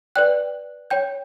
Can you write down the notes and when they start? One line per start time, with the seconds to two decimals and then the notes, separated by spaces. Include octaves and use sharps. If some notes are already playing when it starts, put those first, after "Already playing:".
0.16 B4 D5 G5 F#6
0.90 C#5 G5 G6